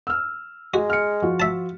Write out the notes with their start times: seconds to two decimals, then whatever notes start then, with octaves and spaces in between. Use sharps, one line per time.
0.07 E6 F6
0.74 G#3 F#4
0.90 F6 C#7
1.22 F3 F4 F#4
1.40 E5 A5